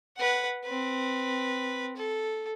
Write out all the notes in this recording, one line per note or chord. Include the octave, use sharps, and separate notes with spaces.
B4 F#5
C4 B4
A4